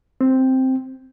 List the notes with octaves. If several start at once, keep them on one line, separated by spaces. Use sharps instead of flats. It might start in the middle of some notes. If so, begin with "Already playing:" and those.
C4